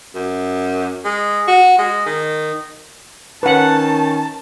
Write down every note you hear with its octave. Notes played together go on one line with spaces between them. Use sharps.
F#2
G#3
F#4
G#3
D#3
D#3 C#4 B4 F#5 A5